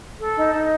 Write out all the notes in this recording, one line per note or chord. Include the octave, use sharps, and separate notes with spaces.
A4
D#4
D#4